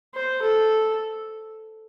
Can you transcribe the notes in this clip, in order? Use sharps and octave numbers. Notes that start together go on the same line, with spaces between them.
C5
A4